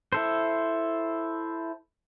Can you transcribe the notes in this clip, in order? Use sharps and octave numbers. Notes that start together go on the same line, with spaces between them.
E4 A4 C5